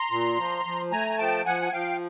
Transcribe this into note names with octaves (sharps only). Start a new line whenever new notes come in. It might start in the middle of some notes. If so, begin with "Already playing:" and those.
Already playing: A#5 C6
A#2
F3
F3
A3 G#5 A#5
G#5
F3 G5 A5
F3 F#5 G#5
G#5
F3 F5 G5